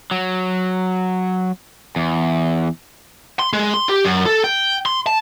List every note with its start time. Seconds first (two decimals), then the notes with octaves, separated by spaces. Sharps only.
0.11 F#3
1.96 E2
3.39 C6
3.53 G#3
3.74 C6
3.89 G4
4.05 F#2
4.26 A4
4.44 G5
4.86 C6
5.07 A5